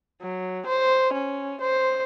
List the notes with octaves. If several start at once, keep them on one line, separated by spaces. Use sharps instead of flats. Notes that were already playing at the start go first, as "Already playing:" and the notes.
F#3
C5
C#4
C5